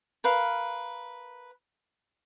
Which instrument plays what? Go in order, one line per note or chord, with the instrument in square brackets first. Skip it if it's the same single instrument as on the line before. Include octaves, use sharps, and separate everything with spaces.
[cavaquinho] A#4 B4 F5